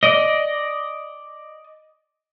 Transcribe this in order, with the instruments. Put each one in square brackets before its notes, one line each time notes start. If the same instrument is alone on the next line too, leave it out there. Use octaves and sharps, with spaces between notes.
[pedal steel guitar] D5 D#5